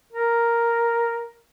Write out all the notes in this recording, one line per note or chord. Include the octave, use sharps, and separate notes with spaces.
A#4